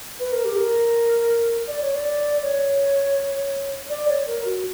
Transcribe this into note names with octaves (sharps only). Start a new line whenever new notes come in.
B4
A#4
G4
A#4
D5
C#5
D5
C#5
D5
C#5
A#4
F#4